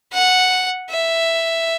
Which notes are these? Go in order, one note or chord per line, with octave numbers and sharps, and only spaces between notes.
F#5
E5